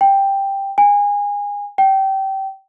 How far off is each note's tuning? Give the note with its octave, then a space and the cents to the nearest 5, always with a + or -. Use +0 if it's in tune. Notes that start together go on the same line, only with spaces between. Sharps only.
G5 +5
G#5 -25
G5 -25